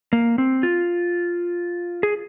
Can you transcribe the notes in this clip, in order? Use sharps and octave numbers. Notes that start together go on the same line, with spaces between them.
A#3
C4
F4
G#4